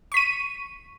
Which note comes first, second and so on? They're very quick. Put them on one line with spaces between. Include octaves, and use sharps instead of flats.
C#6 B6 D#7